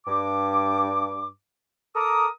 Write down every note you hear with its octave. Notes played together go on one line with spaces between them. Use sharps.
G2 D6
A4 A#4 A#5 D6 D#6